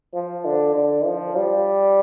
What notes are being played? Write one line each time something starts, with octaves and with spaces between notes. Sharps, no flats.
F3
D3
D3
F3
G3